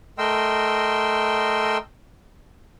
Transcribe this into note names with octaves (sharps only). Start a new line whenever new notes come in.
A3 A#4 D#5 G5 C6 E6